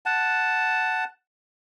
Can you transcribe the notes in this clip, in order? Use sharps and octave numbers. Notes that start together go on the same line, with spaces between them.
F#5 A5